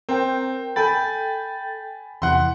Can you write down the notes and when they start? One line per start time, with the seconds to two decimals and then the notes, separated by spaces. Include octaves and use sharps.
0.09 C4 A#4 G5
0.76 A4 G5 G#5 B5 A6
2.22 E2 C3 E3 F#5 C6